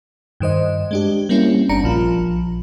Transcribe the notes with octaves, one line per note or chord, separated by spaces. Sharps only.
G2 D#3 C5 D#5
G#3 D4 G4
G3 A#3 C4 C#4 E4
G1 D4 A#5 C#7
A#1 F3 F4